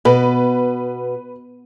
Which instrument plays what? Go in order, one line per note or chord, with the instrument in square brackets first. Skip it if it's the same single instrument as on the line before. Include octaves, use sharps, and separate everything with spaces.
[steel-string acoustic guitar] B2 [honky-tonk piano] B4